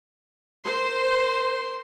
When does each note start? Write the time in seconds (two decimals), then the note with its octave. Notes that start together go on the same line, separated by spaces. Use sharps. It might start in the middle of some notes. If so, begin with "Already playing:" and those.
0.64 A#4 C5 C6